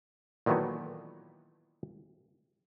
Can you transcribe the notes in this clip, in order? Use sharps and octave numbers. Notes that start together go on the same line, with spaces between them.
A#2 D#3 E3 F#3 A3 B3